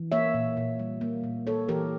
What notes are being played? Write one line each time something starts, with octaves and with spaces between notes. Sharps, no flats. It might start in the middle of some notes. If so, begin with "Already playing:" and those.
Already playing: E3
A#3 C#5 E5
A#2
A#2
G3
A#3
A#2
A#3 A4 C#5
E3 G4 A#4